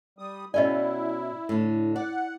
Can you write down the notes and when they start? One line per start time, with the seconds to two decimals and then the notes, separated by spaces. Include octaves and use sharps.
0.19 G3 D#6
0.54 B2 C#4 E4 D5 D#5 G#5
1.49 A2 D3
1.96 D5 F#5